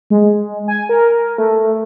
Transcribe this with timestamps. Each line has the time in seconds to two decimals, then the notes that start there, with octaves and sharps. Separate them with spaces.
0.10 G#3
0.68 G#5
0.89 A#4
1.38 A3